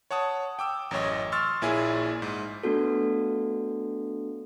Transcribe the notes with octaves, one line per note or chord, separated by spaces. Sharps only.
C#5 F#5 A5 D#6
G5 D6 E6
A1 F#2 C#5 D#5
C6 C#6 E6 F6 A6
A#1 A#2 E4 G#4 C#5 G#5
G#2
A3 B3 D4 F#4 A4